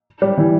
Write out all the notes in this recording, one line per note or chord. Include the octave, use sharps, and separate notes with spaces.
G3
E3